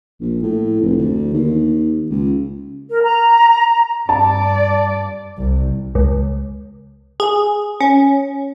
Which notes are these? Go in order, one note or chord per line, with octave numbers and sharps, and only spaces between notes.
A#1
A2
F1
D2
D#2
C#2
A#4
A#5
G2 D5 A5
C2
C#2
G#4
C#4